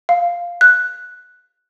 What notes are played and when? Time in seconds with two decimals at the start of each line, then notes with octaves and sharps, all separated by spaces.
0.09 F5
0.61 F#6